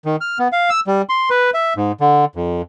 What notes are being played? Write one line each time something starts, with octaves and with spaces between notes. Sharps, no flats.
D#3
F6
B3
F5
E6
G3
C6
B4
E5
G#2
D3
F2